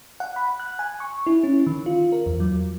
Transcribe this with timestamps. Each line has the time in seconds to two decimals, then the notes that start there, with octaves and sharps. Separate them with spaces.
0.20 F#5
0.36 B5
0.60 F#6
0.79 G#5
1.00 C#6
1.26 E4
1.44 C#4
1.67 D#3
1.86 F4
2.12 A#4
2.26 E2
2.40 F#3